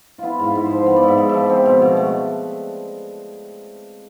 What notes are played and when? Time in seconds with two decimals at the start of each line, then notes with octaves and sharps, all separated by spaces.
0.18 B3 E4 F4
0.39 G#2 F4
0.55 G#2
0.65 C5
0.71 F3
0.86 B3
0.96 D5
1.03 G#2
1.08 E5
1.18 G#2
1.29 F3 E5
1.50 C4
1.66 B2
1.82 B2
1.97 A3